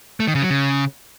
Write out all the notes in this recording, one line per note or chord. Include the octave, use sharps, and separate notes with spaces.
A3
D#3
C#3
F#3
C#3